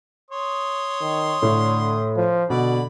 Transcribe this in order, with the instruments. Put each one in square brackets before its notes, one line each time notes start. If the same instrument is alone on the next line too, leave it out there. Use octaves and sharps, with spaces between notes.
[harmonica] C#5 C6 D#6
[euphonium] D#3
[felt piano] A2 [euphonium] D3
[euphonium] F3
[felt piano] B2 [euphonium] D3 [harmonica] D5 B5